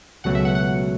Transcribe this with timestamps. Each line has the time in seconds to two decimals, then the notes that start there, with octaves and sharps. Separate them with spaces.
0.24 C#2 B2 F#3 A3 F#5
0.35 E5
0.45 F#5
0.55 F#5